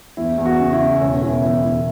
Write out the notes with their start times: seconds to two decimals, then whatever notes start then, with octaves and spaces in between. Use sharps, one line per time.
0.17 E2 E4
0.38 E2
0.45 F#4
0.59 C#3
0.73 E4
0.80 C#3
1.01 E1 C#4
1.21 E1 E4
1.42 E2 E4
1.63 E1 E4